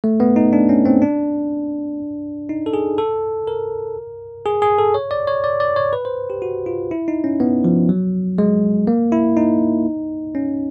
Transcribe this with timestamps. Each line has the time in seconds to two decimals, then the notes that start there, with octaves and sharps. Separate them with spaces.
0.04 A3
0.20 B3
0.36 D#4
0.53 D4
0.69 C#4
0.85 C4
1.02 D4
2.49 D#4
2.66 A4
2.74 G#4
2.98 A4
3.47 A#4
4.46 G#4
4.62 G#4
4.78 A4
4.94 C#5
5.11 D5
5.27 C#5
5.44 D5
5.60 D5
5.76 C#5
5.93 B4
6.05 C5
6.30 G4
6.42 F#4
6.66 F4
6.91 E4
7.08 D#4
7.24 C#4
7.40 B3
7.64 F3
7.89 F#3
8.38 G#3
8.87 A#3
9.12 E4
9.37 D#4
10.35 C#4